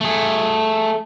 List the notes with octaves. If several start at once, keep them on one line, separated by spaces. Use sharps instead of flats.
A3 G#4